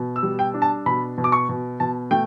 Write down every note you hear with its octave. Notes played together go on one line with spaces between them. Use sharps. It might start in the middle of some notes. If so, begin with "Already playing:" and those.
Already playing: B2
E6
G3
G5
D4
A5
B2 B5
B2
D6
C#6
B2
B2 A5
A3 G5